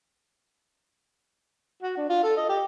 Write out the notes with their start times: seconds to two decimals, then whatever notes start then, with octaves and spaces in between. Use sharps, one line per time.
1.83 F#4
1.97 D4
2.09 F4
2.23 A4
2.37 D#5
2.49 G4